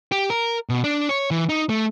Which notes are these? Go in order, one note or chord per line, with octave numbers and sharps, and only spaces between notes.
G4
A#4
B2
D4
C#5
E3
D#4
A3